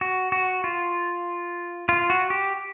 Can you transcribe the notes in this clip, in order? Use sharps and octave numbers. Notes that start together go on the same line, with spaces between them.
F#4
F#4
F4
F4
F#4
G4